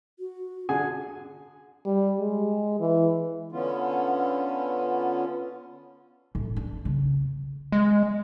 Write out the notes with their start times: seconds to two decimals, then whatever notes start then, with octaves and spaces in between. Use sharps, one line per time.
0.19 F#4
0.69 D3 G#4 G#5
1.86 G3
2.19 G#3
2.80 E3
3.52 D3 B3 C#4 F4
6.35 A1
6.56 D4
6.85 C#3
7.72 G#3